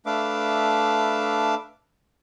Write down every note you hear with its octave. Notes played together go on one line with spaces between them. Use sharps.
A3 D4 B4 E5 F5 D6